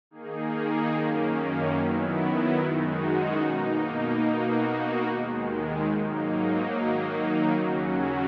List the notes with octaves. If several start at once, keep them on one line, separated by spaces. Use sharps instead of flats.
D#3 A#3 D#4 G#4
F#2 D#3 A#3 C#4
D#3 F#3 B3 E4
F#2 D#3 G#3 D#4 F#4
B2 A#3 D#4
B2 A#3 D#4 F#4
D#2 D#3 G#3
G#2 F#3 A#3 D#4
D#3 F#3 A#3 D#4
D#2 C#3 F#3 C#4 F#4